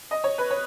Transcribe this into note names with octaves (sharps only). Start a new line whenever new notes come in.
D#5
C#5
B4
C#5